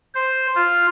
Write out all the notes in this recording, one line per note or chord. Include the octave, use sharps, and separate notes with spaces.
C5
F4